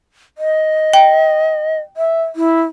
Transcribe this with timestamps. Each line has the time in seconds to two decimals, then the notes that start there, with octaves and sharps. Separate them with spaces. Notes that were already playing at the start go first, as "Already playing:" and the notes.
0.38 D#5
0.93 G5
1.97 E5
2.36 E4